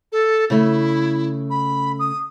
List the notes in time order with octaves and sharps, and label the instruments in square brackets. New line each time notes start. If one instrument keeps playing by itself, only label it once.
[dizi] A4
[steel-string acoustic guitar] C#3 A3 [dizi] E4
[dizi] B5
D#6